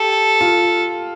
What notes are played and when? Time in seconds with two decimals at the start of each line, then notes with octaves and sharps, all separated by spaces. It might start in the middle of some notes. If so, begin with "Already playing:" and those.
Already playing: G4 A4
0.41 F4